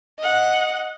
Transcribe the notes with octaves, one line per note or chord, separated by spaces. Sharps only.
D#5 F#5